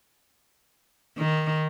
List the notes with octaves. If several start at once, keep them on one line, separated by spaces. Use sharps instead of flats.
D#3